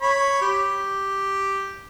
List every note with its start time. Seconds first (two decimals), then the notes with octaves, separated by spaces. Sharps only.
0.02 C#5 B5
0.42 G4